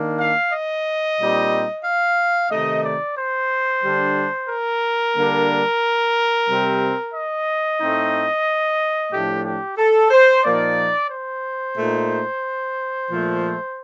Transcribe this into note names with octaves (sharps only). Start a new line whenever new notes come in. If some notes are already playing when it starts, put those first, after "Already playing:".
Already playing: D#3 A#3 D4
F5
D#5
A#2 G3 C4 D#4
F5
C3 D#3 A3 D#4 D#5
D5
C5
D3 G3 D4
A#4
D3 G3 A#3 D4
C3 G3 C4
D#5
A2 A3 C4 D#4
A2 F3 A3 D4 G4
G4
A4
C5
A#2 F3 A#3 D#4 D5
C5
A#2 A3 D#4
A#2 F3 A3